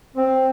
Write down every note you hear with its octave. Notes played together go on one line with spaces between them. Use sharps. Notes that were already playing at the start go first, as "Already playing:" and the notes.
C4